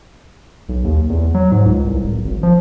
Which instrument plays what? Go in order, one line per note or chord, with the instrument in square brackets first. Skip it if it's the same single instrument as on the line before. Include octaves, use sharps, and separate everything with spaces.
[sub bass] B1
D#2
E2
F#3
G#2
C#2
C2
D1
G#1
F3